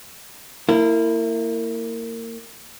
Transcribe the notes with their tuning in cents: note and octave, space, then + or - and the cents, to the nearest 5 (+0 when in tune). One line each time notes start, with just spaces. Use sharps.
A#3 -30 E4 +5